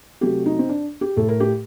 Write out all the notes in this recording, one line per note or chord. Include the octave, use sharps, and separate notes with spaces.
C3 F#3 A3 G4
D#4
C4
D4
G4
A2 A3 A4
A#4
G4